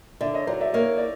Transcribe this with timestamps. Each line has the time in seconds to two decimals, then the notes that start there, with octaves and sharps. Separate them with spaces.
0.21 D3 D5 E5
0.34 C#5 D#5
0.47 F#3 C5 D5
0.61 D5 E5
0.73 A#3 C#5 D#5
0.98 D5